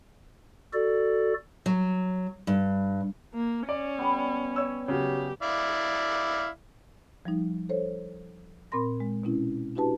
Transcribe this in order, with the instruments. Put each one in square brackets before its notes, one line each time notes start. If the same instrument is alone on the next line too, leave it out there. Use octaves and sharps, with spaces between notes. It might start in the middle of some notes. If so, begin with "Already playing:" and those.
[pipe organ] F#4 A4 D5
[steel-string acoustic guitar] F#3
G2
[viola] A#3
[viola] C#4 [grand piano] D5
[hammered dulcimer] G3 B3
[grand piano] C#5 E6
[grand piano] C#3 F#3 [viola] G4
[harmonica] E4 D5 F5
[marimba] F3 G3 D#4
A4 C5 C#5
A#2 C4 A#4 B5 C6 A#6
G#3
B2 C4 C#4 E4
D4 E4 F#4 G4 B4 A5